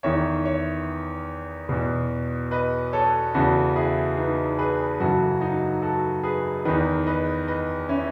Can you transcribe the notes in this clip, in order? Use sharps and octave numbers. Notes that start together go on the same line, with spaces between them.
E2 D#3 C#5 E5
C#5 E5
E2 B2
B4 D#5
A4 C#5
E2 C#3 E3 F#4 A4
E4 G#4
B3 D#4
G#4 B4
F#2 C#3 E3 F#4 A4
D#4 F#4
F#4 A4
G#4 B4
E2 D#3 B4 D#5
B4 D#5
B4 D#5
C#4 E4